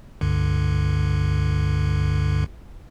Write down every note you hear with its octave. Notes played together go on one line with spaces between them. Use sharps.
C#2 G2 D3